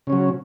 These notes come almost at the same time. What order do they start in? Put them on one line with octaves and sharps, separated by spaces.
C#3 C#4 F#3